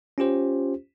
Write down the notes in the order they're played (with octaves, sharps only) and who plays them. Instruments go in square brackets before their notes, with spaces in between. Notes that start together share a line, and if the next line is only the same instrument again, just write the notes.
[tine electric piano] C#4 F4 G4 C5